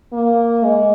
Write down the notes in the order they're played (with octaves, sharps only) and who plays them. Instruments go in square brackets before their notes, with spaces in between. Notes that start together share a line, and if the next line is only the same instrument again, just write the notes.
[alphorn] A#3
G#3